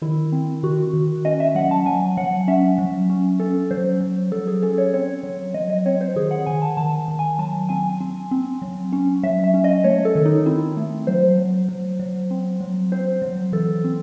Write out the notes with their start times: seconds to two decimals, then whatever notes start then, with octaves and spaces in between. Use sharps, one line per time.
0.02 D#3 E4
0.32 C4
0.63 D#3 F#4
0.94 D#3
1.25 C#4 D#5
1.40 E5
1.55 F#3 F#5
1.71 A5
1.86 F#3 G#5
2.17 F#3 F#5
2.48 C#4 E5
2.78 F#3
3.10 C#4
3.40 C#4 A4
3.71 F#3 C5
4.01 F#3
4.32 F#3 A4
4.47 G#4
4.62 C#4 A4
4.78 C#5
4.94 C4 C#5
5.23 F#3
5.54 F#3 D#5
5.70 D#5
5.86 C4 C#5
6.01 C5
6.16 D#3 G#4
6.31 F#5
6.46 D#3 G#5
6.62 A5
6.77 D#3 A5
7.08 D#3
7.19 G#5
7.39 F#3 A5
7.69 C4 G#5
8.01 C4
8.31 C4
8.62 F#3
8.92 C#4
9.23 F#3 E5
9.44 E5
9.54 C#4
9.64 D#5
9.84 A3 C#5
10.05 A4
10.15 D#3
10.25 D#4
10.46 C4 E4
10.77 A3
11.07 F#3 C5
11.38 F#3
11.69 F#3
11.99 F#3
12.31 C4
12.60 F#3
12.92 C4 C5
13.22 F#3
13.52 E3 A4
13.84 C4